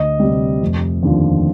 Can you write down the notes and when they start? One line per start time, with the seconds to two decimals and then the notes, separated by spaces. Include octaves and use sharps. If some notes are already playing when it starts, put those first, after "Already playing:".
Already playing: D2 D#5
0.20 C3 G3
0.61 F1
1.03 D#2 D3 F3